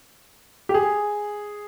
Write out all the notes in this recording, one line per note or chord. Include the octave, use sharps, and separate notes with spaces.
G4
G#4